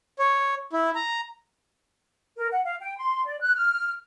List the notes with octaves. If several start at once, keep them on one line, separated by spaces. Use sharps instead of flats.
C#5
E4
A#5
A#4
F#5
F5
G5
C6
D5
F#6
F6